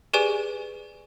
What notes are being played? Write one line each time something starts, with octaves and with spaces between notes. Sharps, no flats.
G4 G#4 B4 D5 G#5 E7